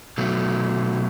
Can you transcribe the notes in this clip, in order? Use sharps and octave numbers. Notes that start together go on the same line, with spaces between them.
B2 F#3 A3